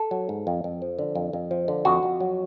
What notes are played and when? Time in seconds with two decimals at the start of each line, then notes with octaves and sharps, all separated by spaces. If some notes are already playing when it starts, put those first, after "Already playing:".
Already playing: A4
0.11 F#3
0.29 G#2
0.47 F2
0.64 F2
0.82 F3
0.99 D3
1.15 F2
1.33 F2
1.51 F3
1.68 D3
1.85 F2 F#4
2.03 F2
2.20 F#3